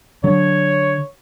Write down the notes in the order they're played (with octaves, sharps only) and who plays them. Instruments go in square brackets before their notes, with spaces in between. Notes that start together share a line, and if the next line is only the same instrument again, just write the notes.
[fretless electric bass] D3 [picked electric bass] F#3 [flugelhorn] C#5